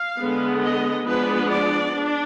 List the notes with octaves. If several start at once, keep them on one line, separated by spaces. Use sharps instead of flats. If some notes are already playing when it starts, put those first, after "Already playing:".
Already playing: F5
D3 G#3 B3
D#5
F3 G#3 B3 D4 B4
D5
D4